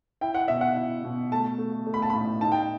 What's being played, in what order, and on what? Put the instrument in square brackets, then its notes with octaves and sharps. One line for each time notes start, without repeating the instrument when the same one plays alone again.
[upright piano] E4 G5
F#5
B2 E5
F#5
E4
B2
A3 A5
A3
A3
B5
A5
A2 B5
D#4 A5
G5